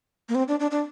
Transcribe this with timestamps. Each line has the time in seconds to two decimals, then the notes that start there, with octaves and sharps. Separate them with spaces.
0.29 A#3
0.35 C4
0.48 D4
0.60 D4
0.71 D4